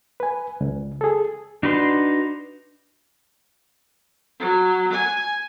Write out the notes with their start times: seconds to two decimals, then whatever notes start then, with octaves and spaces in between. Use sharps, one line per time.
0.20 B4 G#5
0.61 C#2
1.01 G#4 A4
1.63 D4 D#4 F#4 B4 C6
4.40 F#3
4.93 G#5